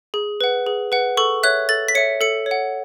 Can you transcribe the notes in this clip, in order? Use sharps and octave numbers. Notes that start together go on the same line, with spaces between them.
G#4
B4 F#5
G#4
B4 F#5
A4 C#6
C#5 E5 F#6
A4 A6
B6
C#5 E5 C#7
A4 C#7
C#5
F#5